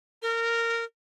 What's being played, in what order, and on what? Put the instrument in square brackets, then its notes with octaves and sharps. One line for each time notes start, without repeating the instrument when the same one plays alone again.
[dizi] A#4